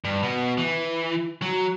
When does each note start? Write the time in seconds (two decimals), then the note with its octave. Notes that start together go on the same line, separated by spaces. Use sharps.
0.04 G2
0.23 B2
0.58 E3
1.42 F#3